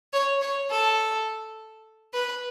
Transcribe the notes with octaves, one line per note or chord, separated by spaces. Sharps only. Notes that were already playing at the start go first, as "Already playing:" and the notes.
C#5
C#5
A4
B4